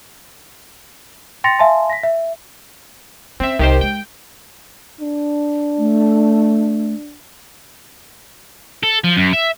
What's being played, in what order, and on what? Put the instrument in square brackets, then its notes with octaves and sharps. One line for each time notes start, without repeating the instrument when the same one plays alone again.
[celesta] G5 C6 A6 A#6 C#7 F7
E5 F5 G#5 A5 C6
A#6 B6
E5
[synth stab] C4 E5 [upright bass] C#4
[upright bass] C2 [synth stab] D#3 G4 C5
[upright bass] G#3 [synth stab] G5
[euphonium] D4
[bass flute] A3
[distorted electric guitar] A4
F3
F#2
E5